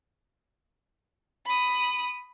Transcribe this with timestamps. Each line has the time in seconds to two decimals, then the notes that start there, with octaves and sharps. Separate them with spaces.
1.46 B5 D#6